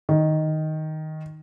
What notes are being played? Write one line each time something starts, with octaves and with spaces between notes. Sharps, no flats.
D#3